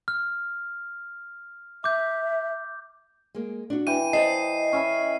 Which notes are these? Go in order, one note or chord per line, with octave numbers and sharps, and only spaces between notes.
F6
E5 D6 G6
G#3 A#3
D4 F#4
E3 G5 D#7
C5 D5 D#5 A5 C7
C#4 E5 B5